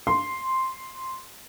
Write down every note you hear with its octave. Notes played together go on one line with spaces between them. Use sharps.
C6